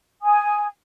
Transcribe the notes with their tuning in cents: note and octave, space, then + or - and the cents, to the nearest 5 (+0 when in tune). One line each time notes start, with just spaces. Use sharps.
G#5 +0 D#6 +0